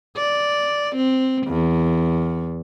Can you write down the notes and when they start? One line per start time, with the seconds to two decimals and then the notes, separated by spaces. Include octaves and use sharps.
0.16 D5
0.96 C4
1.47 E2